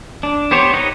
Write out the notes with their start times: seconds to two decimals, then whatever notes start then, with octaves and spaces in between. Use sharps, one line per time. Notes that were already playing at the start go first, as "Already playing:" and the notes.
0.23 D4
0.51 B3 G4 C5 C#5
0.74 D#4 G4 B4 C#5 D#5